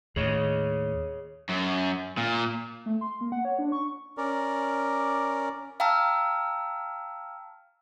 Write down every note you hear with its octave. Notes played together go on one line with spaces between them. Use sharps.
D#2 A2 G#4 C#5 D#5
F#2
A#2
A3
C6
A#3
F#5
C#5
D4
C#6
C#4 A#4 D5
F5 G5 A5 A#5 E6 F6